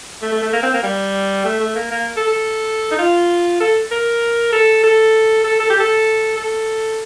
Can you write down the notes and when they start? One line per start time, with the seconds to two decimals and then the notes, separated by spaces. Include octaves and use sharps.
0.22 A3
0.32 A3
0.42 A3
0.53 A#3
0.63 C4
0.74 A#3
0.83 G3
1.45 A3
1.60 A3
1.76 A#3
1.91 A#3
2.17 A4
2.27 A4
2.91 D#4
2.99 F4
3.60 A4
3.91 A#4
4.52 A4
4.83 A4
5.44 A4
5.60 A4
5.70 G4
5.80 A4
6.37 A4